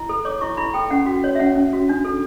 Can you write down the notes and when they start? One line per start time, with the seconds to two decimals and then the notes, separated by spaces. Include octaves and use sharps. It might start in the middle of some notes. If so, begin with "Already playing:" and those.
Already playing: E4
0.09 A4
0.25 C#5 D6
0.41 E4 C#6
0.57 E4 B5
0.74 A4 G5
0.90 C#4 F#5
1.06 F#4
1.24 C#5
1.35 E5
1.39 C#4 F#5
1.55 C#4
1.73 F#4
1.89 D4
2.04 A4